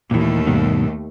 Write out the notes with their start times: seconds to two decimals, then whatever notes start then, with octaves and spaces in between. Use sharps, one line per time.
0.11 D#2 A#2 E3 A3
0.47 G2 B2 D#3